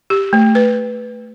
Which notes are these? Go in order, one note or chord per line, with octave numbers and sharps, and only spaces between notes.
G4
A3
B4